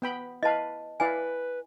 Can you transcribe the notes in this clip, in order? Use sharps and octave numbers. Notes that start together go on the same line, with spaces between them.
B3 G5 B5
E4 B4 D#5 F5 A5
E4 B4 D5 F5 G#5